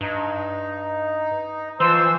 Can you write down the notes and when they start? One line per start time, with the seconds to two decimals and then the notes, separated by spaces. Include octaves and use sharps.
0.01 G2 D#4
1.80 E3 F3 C5 E6